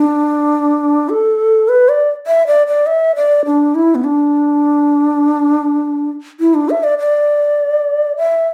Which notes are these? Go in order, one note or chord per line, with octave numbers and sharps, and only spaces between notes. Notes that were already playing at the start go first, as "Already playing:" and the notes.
Already playing: D4
A4
B4
D5
E5
D5
D5
E5
D5
D4
E4
B3
D4
E4
D4
E5
D5
D5
E5